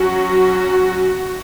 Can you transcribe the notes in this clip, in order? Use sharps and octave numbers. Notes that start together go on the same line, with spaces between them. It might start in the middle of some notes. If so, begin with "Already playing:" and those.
Already playing: F#3 C#4 F#4